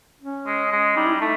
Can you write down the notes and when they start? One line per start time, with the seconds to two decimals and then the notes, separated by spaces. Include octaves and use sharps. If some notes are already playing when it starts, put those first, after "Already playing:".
0.22 C#4
0.46 G#3
0.72 G#3
0.96 G3 D#4
1.06 E4
1.14 D#4
1.21 A3